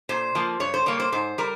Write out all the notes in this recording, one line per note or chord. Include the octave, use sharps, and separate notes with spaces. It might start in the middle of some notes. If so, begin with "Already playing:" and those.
A#2 C5
F3 A#3
G2 C#5
C5
G3 A#3 C#5
C5
G#2 C5
G3 A#4